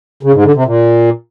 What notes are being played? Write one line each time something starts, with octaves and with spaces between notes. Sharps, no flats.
C#3
G#2
D3
C3
A#2